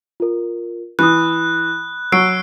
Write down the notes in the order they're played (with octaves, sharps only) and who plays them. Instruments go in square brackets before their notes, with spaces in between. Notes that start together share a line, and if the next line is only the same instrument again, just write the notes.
[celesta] F4 A#4
[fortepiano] E3 [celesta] B5 D#6 [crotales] F#6
[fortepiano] F#3 [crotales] E6 C7 D7